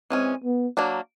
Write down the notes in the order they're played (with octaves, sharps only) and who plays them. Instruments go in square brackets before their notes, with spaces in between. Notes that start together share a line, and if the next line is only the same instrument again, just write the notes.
[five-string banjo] E3 G#3 C#4 [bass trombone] C4
[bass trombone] B3
[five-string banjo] F#3 A#3 D4 F#4